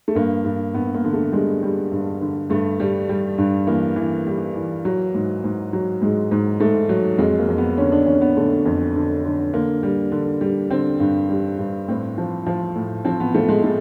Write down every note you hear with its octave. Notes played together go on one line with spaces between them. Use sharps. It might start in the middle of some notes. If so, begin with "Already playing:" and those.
A3
G2 A#3
G2
G2 B3
A#3
D3
A3
G3 G#3
G3
G2
D3
G2 A3
G3
G3
G2
E3 A#3
E3
G3
E3
F#3
G#2
G#2
F#3
G#2 G#3
G#2
G#2 A3
F#3
F2 G#3
A#3
F2
B3
D3 C#4
D4
F2 C#4
B3
D3 A3
F2
D3
D3
D3 A#3
G3
D3
G3
D3 C4
G2
G3
G2
A2 C4
F3
F3
A2
F3 C4
B3
F3 A3
G#3
A2 A3